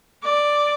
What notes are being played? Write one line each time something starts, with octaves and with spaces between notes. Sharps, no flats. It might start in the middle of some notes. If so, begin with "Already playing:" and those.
D5